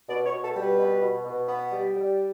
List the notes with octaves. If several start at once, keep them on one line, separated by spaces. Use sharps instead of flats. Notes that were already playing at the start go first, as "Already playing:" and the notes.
B2 D5
C#5
B2
A4
G3
B4
B2
B2
B2
B3
G3
G3